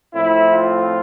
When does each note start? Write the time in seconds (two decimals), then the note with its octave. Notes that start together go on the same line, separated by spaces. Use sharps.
0.14 A2 F3 C4 E4
0.51 F4